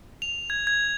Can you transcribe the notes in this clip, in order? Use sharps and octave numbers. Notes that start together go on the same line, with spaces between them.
F7
G#6
G#6